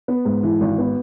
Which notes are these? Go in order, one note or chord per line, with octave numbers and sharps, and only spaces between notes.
B3
G#2
E3
G#1
B3